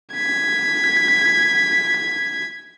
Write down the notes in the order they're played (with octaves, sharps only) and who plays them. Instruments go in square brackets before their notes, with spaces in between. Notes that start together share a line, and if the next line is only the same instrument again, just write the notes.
[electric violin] G#6 B6